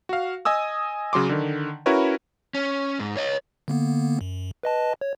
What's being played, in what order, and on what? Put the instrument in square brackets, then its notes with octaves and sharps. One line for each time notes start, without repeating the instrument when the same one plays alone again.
[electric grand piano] F#4 F5
D#5 G#5 D#6 E6
C#3 F#3 C6 D6
D3 D#3
C#4 E4 F#4 A#4 B4 C#5
[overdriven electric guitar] C#4
G#2
C#5 D#5
[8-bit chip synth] D3 A#3 B3
F#2
B4 D#5 A5
C#5